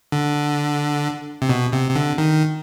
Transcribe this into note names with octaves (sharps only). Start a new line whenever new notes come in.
D3
C3
B2
C3
C3
D3
D#3